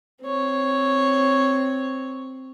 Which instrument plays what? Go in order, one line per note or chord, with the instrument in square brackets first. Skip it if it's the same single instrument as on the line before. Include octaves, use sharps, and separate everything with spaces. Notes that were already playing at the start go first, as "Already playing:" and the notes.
[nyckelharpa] C4 C#5